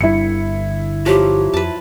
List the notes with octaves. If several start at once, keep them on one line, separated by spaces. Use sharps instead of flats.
G1 D3 G3 E4 C#7
F3 F#3 G4
F2 B4 A5